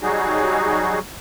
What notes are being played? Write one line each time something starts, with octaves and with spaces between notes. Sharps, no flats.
F#3 G3 D#4 F#4 G#4